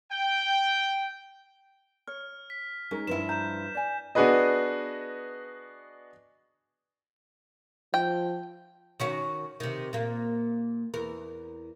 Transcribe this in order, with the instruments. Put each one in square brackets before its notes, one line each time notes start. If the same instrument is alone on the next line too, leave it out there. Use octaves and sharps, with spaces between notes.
[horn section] G5
[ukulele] C#5 [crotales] F6
[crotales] B6
[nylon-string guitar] G#3 [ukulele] C#4 D#4 A#4
[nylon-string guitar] G2 F3 E4 [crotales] E7
[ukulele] A#5 [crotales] G6 E7
[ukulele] D5 G#5
[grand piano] B3 D4 F#4 G#4 B4 D#5
[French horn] F3 [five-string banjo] G5
[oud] D#3 C#4 F#4
C3 D#3
A#2 A#3
E2 A#4